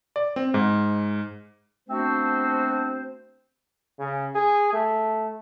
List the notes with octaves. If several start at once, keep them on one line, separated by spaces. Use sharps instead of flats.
D5
C4
G#2
A3 B3 C4 D4 F#4 C5
C#3
G#4
A3